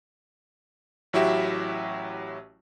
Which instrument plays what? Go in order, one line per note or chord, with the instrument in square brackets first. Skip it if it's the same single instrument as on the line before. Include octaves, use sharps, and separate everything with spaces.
[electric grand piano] A1 F#3 E4 F#4 G4 E5